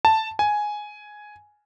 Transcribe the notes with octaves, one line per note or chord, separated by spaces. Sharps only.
A5
G#5